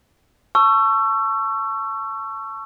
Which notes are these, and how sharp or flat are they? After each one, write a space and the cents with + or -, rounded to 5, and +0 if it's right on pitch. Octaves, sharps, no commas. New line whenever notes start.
A5 +0 C#6 +0 E6 +30